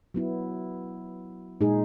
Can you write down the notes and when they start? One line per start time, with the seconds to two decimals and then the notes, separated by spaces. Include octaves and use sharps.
0.14 F#3 B3 E4
1.61 A#2 G#3 D#4 G#4